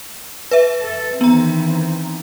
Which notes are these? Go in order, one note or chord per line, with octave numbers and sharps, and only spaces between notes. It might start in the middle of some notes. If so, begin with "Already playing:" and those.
B4 E5
A4
D#3 E3 B3 C4 A#5